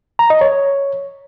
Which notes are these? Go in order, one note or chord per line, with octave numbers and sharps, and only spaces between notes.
A#5
D#5
C#5